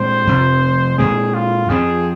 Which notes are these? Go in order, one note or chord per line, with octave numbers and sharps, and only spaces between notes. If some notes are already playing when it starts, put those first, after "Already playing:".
Already playing: A#2 G#3 C4 C5
F2 C3 F3
A#2 G#3 C4 G#4
F4
F2 F3 C4 G#4